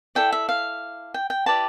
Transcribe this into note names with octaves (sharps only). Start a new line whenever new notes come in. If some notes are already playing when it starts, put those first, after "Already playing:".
E4 A4 D5 G5
E5
F5
G5
G5
E4 G4 B4 D5 A5